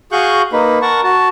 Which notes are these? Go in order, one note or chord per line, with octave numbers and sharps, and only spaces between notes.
F#4 G#4 F5 C#6 F#6 G6
A#3 D#4 B4
A#4 F#5 A5 C#6
F#4 A5